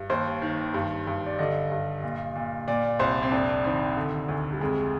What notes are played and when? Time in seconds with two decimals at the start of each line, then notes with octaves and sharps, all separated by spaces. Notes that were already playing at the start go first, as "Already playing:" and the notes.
Already playing: G2
0.10 D#2 C5
0.42 D#3
0.74 G2
1.07 G2
1.26 D5
1.38 D3 D#5
1.71 G2
2.03 A#2
2.36 A#2
2.68 A#2 D5
2.99 C2 C5
3.23 C4
3.31 F2 D4
3.64 D#3 C4
3.97 D3
4.29 D2
4.53 G3
4.61 F2 G#3